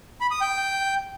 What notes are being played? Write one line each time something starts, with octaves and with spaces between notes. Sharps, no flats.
B5
D#6
G5